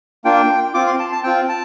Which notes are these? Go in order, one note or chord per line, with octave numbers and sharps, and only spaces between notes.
A#3 D4 F4 G5
C4 F4 D6
C6
A5
A5
C4 F4 G5
A5